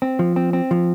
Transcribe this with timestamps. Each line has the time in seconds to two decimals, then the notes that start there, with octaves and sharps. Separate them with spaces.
0.02 C4
0.19 F3
0.36 C4
0.53 C4
0.71 F3